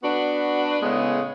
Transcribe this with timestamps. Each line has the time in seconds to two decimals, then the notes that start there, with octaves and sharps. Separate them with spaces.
0.03 B3 D4 F#4 B4
0.82 A2 C#3 G#3 B3